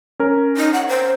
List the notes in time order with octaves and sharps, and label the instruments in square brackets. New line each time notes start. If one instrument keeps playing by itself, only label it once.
[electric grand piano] C#4 A#4
[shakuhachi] D#4
F#5
C5